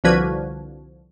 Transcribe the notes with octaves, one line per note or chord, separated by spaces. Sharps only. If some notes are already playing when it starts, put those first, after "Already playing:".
C2 D3 F3 F#4 B4 G#6